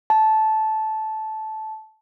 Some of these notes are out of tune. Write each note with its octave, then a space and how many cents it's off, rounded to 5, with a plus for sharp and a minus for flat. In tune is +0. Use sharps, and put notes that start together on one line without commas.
A5 -15